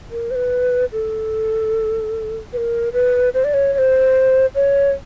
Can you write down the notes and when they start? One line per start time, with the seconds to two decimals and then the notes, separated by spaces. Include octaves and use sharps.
0.11 A#4
0.31 C5
0.35 B4
0.92 A4
2.53 B4
2.57 A#4
2.93 B4
3.34 C5
3.44 D5
3.54 C#5
3.73 C#5
3.78 C5
4.55 C#5